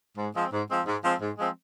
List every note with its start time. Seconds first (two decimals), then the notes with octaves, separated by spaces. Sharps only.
0.17 G#2
0.35 F3 G#3 C4
0.52 G#2
0.70 F3 G#3 C4
0.86 G#2
1.04 F3 G#3 C4
1.21 G#2
1.38 F3 G#3 C4